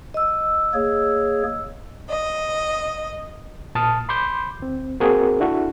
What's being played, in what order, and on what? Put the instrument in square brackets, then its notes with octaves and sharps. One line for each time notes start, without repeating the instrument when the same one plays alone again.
[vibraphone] D#5 E6
[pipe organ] A#3 G#4 C#5
[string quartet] D#5
[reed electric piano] A#2 A5 D#6 F6
B5 C6 D6 G6
D2 C4
A#3 C4 F#4 G#4 A#4
D4 E4 F#4 A4